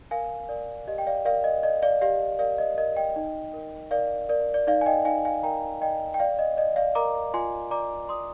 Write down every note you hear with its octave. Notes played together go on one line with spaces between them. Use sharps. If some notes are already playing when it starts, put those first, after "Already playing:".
A#4 F5 G#5
A#4 D5
G4 D#5
G5
D5 F5
A#4 D5 F5
D#5
D5 D#5
D5 F5
G4 D5 F5
A#4 D5 F5
D#5
A#4 D#5
D#5 G5
D#4
A#4
A#4 D5 F5
A#4 D5
D5
D#4 D5 F5
G#5
D#5 G5
D#4 F5 G#5
F5 G#5
A#4 G5 A#5
D5 D#5 G5
G5
D5 F5
D#5
D5 D#5
D5 F5
A#4 A#5 D6
F4 G#5 C6
D5 A#5 D6
D5 C6 D#6